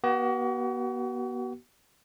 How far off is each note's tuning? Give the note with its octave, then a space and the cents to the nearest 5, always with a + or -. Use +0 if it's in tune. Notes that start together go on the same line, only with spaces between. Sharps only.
B3 -35 F#4 +40